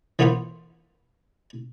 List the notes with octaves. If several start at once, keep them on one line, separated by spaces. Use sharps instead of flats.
E3 A#3 B3 E4 F4 C5